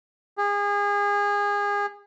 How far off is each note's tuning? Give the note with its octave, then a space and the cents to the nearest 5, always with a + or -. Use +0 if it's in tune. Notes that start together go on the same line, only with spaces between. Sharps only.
G#4 -30